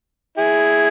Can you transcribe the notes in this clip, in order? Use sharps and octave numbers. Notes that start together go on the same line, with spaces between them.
E4 G#4